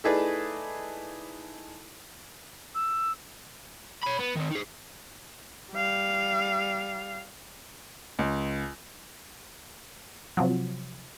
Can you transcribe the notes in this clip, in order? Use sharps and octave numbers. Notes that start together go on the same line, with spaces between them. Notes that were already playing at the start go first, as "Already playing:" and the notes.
A3 D#4 E4 G#4 B4 D5
E6
C#5 B5
B3
D#3 C4
D#4 G#4
G3 F5
C#2
C3 F3 F#3